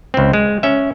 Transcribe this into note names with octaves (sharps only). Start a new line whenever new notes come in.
C#2 C4
G#3
C#4 E5